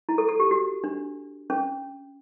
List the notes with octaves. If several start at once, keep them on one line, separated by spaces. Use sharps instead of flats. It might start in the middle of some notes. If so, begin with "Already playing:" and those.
E4
A4
A4
G4
F#4
D4
C#4